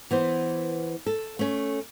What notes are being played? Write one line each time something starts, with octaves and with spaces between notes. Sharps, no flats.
E3 B3 C5
A4
A3 C#4